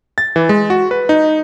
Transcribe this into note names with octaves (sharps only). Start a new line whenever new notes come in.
A6
E3
G#3
F#4
B4
D#4